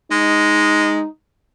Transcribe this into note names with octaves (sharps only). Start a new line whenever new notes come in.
G#3 D#4